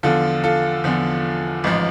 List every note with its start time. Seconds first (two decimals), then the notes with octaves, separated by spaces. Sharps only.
0.03 E2 D3 F3 F4 A4
0.44 F4 A4
0.84 E2 D3 F3
1.64 A1 G#2 F3